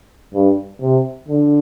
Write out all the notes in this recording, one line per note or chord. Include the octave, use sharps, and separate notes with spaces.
G2
C3
D3